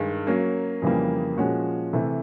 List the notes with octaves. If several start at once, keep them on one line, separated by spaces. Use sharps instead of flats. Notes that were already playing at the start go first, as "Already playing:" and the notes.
Already playing: G2 D#3 G#3
F#3 A#3 C#4
F2 C#3 E3 G3 A#3
A#2 F3 G#3 C#4 F#4
C3 E3 A3